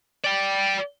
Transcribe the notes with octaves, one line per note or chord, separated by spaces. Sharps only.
D5 G5